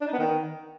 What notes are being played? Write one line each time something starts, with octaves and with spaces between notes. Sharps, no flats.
D4
D#4
B3
D#3